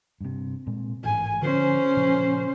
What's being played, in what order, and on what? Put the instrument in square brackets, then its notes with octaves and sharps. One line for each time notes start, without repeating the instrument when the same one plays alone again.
[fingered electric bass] G2 C3
A#2 G#3 C4
[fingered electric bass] A1 G#2 [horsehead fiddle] G#5
[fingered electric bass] D3 F3 [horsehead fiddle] C#4 C5
[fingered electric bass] A#2 C#3 F3